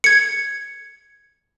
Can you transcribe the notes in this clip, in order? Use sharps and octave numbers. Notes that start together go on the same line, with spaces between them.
G#6 C#7